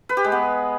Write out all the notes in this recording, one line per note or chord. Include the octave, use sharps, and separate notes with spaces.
B4
G4
G#3
B3